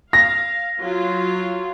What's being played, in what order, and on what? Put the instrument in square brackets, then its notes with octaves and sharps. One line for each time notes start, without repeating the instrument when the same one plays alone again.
[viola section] F5 [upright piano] A#6
[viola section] F#3 F4